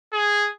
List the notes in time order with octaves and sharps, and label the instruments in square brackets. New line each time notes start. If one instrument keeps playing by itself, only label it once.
[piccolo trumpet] G#4